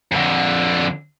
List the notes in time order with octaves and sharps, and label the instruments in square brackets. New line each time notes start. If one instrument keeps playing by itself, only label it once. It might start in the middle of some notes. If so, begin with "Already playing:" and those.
[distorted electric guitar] F2 D3